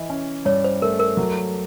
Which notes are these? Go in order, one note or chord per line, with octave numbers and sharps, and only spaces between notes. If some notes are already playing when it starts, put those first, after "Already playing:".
Already playing: E3 D#5
C#4
G2 C#5
C5
A3 A#4
A#4
F#3